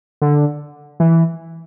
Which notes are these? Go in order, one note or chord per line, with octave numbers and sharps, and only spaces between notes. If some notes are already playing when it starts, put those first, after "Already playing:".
D3
E3